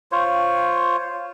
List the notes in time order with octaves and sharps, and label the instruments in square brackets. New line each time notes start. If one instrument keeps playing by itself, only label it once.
[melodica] F4 C5 C#5